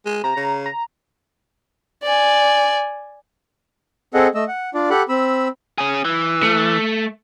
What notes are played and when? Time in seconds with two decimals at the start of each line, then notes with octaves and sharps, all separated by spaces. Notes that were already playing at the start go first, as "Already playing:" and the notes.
0.06 G#3
0.24 C3 A#5
0.36 C#3
0.66 A#5
2.03 D5 G#5
4.14 C4 G#4 A4 D#5 F#5
4.35 A3 D#5 E6
4.48 F#5
4.74 D4 F4 D5
4.90 G4 A4 F#5 B5 F#6
5.09 C4 B5 E6
5.78 C#4 G#4
6.05 E3
6.43 A3